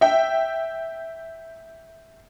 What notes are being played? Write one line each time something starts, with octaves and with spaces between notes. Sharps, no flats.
E5 G5